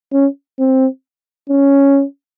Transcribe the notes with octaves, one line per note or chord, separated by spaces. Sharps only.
C#4
C4
C#4